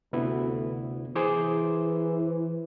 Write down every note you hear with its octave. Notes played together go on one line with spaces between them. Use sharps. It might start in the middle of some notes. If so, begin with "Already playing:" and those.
D2 C3 B3 E4
E3 G#4 C5 D6